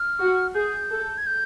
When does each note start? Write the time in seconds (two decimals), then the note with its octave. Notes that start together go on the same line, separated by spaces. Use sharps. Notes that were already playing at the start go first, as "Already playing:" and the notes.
Already playing: F6
0.19 F#4
0.54 G#4 G6
0.90 A4
1.18 G#6
1.27 G6